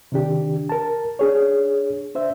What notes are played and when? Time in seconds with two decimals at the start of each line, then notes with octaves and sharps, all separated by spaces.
0.12 C3 D#3 D4 G4
0.69 A#4 A5
1.19 D4 G#4 C#5
2.15 D4 C5 E5